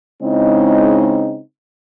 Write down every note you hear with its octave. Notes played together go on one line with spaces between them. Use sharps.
C#3 G#3 C4 D#4 E4 D#5